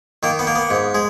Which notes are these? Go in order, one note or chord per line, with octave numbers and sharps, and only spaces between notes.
D#3 A#3
B3
A#3
B3
G#2
G#3